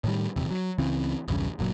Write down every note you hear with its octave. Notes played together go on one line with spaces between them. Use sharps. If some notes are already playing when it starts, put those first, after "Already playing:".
A2 D#3 G3
D#1 E2 C3
F#3
C#2 C#3 E3 C4
B1 E2 G2 C#3
F#1 A#2 F#3